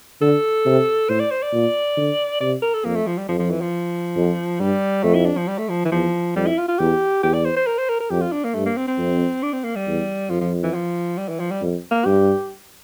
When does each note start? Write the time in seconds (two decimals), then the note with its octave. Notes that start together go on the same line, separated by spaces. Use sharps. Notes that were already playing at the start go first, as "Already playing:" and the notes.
0.21 D3 A4
0.65 C3
1.09 A2 C5
1.20 D5
1.31 C5
1.42 D5
1.53 A#2
1.97 D3
2.40 C3 D5
2.62 A#4
2.74 A4
2.85 F2 A#3
2.96 A3
3.07 F3
3.18 G3
3.28 F2 F3
3.39 F3
3.50 E3
3.61 F3
4.16 F2
4.60 G2 G3
5.03 F2 A3
5.15 E4
5.26 D4
5.37 F3
5.48 G3
5.58 A3
5.69 F3
5.85 E3
5.92 E2 F3
6.36 F2 G3
6.47 E4
6.58 F4
6.68 F4
6.79 E2 G4
7.23 E2 G4
7.34 D5
7.45 C5
7.56 C5
7.66 A#4
7.78 C5
7.89 A#4
8.00 A#4
8.10 F2 G4
8.21 F4
8.32 D4
8.44 A#3
8.54 G2 A3
8.66 A#3
8.77 C4
8.88 C4
8.98 F2
9.43 D4
9.53 C4
9.64 A#3
9.76 G3
9.87 E2
10.30 F2 F3
10.41 F3
10.63 E3
10.74 F3
11.18 G3
11.29 E3
11.40 F3
11.51 G3
11.62 F2
11.91 A#3
12.05 G2 G4